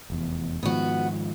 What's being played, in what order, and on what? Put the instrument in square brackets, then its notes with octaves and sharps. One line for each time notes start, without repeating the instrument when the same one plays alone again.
[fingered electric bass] F1 E2
[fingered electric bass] G#2 D#3 F3 [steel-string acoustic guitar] B3 F#4